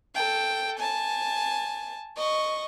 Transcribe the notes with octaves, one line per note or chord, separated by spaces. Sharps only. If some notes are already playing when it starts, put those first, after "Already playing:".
A4 G5
G#5 A5
D#5 C#6